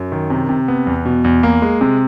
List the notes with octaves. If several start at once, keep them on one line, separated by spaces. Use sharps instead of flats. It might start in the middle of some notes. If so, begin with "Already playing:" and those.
Already playing: F#2
D#3
C3
C3
B3
E2
B2
E2
A#3
G#3
C3